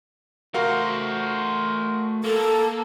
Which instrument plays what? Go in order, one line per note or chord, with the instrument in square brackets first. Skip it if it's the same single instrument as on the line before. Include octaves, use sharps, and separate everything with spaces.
[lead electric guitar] A3 C5 [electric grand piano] F#4 A#4 F5
[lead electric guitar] A#3 [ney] A4